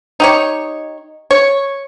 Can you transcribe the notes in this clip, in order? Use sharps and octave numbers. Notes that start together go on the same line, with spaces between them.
D#4 G4 C#5
C#5